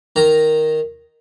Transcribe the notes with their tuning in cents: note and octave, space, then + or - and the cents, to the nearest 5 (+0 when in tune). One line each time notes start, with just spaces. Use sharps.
D#3 +0 A#5 +0